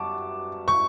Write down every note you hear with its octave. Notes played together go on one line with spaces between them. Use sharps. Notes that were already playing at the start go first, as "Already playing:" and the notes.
Already playing: F#2 G3 B3 A5 C#6 D6
C#6